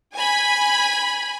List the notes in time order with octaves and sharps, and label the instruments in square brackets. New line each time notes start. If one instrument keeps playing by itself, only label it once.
[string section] G#5 B5